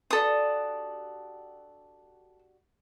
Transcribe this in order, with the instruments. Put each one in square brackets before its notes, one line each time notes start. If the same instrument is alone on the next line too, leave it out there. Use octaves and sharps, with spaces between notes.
[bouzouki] D4 F#4 G4 [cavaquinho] A4 D#6